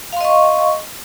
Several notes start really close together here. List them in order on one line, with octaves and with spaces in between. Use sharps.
F5 C6 D#5 C#6